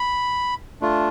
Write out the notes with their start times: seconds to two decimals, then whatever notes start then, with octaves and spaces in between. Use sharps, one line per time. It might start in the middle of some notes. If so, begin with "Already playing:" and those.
Already playing: B5
0.81 A3 D4 F4